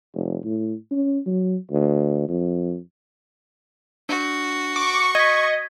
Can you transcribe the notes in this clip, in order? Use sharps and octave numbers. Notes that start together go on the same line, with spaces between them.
F1
A2
C#4
F#3
D2
F2
D4 F#4
C#6 D6
D#5 G#6 B6